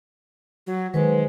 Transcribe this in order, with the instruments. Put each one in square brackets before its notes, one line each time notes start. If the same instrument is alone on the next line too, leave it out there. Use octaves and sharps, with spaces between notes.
[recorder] F#3
[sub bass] D#3 [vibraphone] F#3 B4 C5 [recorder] G#3